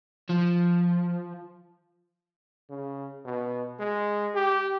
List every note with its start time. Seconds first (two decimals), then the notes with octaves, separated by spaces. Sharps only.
0.30 F3
2.70 C#3
3.25 B2
3.80 G#3
4.35 G4